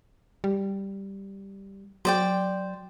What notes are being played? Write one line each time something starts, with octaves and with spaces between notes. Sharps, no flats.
G3
F#3 C5 D5 G5